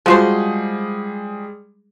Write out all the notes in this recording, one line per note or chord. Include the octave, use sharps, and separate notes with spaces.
F3 G3 G#3 F#4 G#4 C5